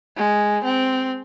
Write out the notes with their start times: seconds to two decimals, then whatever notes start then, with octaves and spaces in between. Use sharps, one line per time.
0.17 G#3
0.65 C4